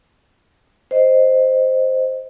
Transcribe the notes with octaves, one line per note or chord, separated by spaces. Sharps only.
C5 D#5